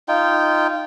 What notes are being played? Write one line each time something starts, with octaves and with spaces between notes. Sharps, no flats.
D#4 F4 G5